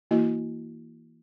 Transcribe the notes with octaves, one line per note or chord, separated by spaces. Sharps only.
E3 A#3 E4 F#4 D#5